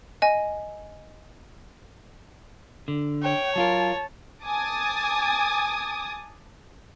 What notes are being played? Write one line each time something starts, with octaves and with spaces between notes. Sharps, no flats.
D#5 G#5
D3
C#5 G5
F#3 F4 A#4 A5
G#5 A5 D6 D#6 A6